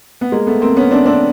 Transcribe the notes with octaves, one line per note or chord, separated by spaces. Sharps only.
B3
G#3 A#3
A3 B3
A#3 C4
B3 C#4
C4 D4
C4 D4